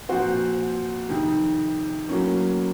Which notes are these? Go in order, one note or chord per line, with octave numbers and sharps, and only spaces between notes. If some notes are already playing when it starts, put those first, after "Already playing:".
A#2 F3 C4 F#4 C5
F2 C3 D#3
A2 F#3 A#3 C#4